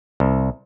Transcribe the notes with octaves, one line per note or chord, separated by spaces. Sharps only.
C2